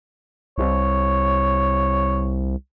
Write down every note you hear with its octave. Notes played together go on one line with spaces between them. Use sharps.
C2 C#5